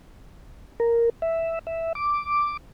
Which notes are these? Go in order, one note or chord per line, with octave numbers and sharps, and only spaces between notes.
A#4
E5
E5
D6